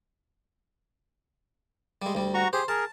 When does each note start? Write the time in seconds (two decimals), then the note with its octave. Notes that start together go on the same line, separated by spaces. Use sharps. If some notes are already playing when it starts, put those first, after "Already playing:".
2.02 G3 G#3
2.15 D2 G3
2.34 F#4 A#5 C#6
2.53 G4 G#4 C5
2.68 G#4 A#4 A5